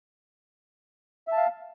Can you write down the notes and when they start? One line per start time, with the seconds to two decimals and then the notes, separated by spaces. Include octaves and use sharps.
1.28 E5
1.32 A5
1.37 F5